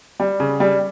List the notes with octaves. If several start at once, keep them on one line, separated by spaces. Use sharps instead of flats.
G3
C#3
G3